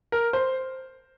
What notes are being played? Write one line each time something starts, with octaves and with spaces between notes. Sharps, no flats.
A#4
C5